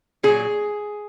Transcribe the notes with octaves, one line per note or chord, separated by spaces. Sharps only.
A#2 F#3 G#4